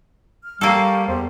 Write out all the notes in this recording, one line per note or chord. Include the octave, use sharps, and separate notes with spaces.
F6
G3 A#3 G4 A4 F5 C#6
E2 G4 C5